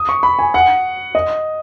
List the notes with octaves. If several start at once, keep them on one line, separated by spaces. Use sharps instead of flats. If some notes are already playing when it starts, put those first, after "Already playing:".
Already playing: D#6
C#6
B5
G#5
F#5
D#5